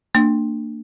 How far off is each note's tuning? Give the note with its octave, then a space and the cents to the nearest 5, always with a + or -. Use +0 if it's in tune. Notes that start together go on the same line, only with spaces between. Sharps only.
A#3 -35 D4 +15